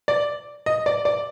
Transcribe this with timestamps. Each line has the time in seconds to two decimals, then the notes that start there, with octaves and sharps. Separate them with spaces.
0.08 D5
0.66 D#5
0.86 D5
1.05 D5